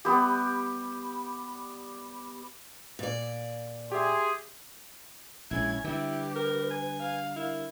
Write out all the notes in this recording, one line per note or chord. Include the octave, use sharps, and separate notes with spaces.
G3 B3 G4
A#2 D5
G4 G#4 E5 C6
A#1 G#3 C#4 E4 G#6
D3 G3 E4 G4 B4
A#4
G#5
F5
E4 A#4